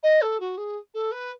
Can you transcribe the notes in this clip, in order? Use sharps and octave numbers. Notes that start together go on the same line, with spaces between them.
D#5
A4
F#4
G#4
A4
B4